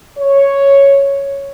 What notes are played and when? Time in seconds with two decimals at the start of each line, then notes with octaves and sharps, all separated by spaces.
0.18 C#5